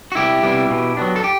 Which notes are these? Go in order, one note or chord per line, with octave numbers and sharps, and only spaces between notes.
F#4
C2 E4 G4
C3 G3 B3
B2
F#3 B3 D4
A4
G4